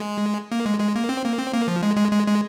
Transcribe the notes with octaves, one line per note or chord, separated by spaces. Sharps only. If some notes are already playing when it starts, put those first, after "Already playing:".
Already playing: G#3
A#3
G#3
G#3
A#3
C4
A#3
C4
A#3
F3
G#3
G#3
G#3
G#3